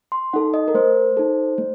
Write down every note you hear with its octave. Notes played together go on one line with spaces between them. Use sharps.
C6
D#4 A4 F#5
D#5
A#4
A3 C5
D#4 A4
A3